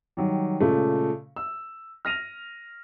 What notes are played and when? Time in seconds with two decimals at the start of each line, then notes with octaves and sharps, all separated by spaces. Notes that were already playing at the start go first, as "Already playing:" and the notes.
0.17 D#3 F#3 G3
0.61 A#2 C#3 G#3 A3
1.36 E6
2.05 F6 A#6 D#7 F7